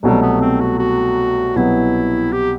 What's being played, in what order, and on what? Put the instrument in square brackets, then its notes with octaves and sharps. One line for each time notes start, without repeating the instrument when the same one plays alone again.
[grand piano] C2 B2 F#3 A3 [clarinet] G3
[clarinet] B3
C4
F#4
F#4
[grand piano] C2 B2 F#3 B3 [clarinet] E4
[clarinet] G4